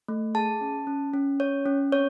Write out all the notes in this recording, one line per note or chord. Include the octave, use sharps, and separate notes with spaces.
A3
G#4 A5
C#4
C#4
C#4
C#4 C#5
C#4
C4 C#5